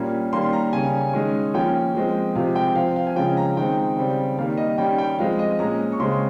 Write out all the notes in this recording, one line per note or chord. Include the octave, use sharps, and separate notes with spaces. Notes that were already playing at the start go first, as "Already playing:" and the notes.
Already playing: A#2 G3 A#3 C#4
D#3 G3 A#3 C#4 C6
A#5
C#3 G3 C#4 G#5
D#3 G#3 C#4
F3 A#3 C#4 G5
F3 G#3 C4
C3 F3 G#3 C4 F5
G5
F3 C4 F5
F5
G#5
C#3 F3 G#3 C#4 G5
A#5
D#3 G#3 C4 G5
C#3 G3 C4
D#3 G3 A#3 F5
D#5
D#3 G3 C#4 G5
G5
F3 G#3 C4 F5
D#5
A#2 G#3 C#4 A#5
C#6
C#3 G#3 C4 C6